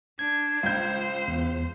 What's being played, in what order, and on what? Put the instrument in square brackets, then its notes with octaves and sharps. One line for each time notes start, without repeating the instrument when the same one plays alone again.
[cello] D4 [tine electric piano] G#6
[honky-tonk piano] C#2 G6 [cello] C5
[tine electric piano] E2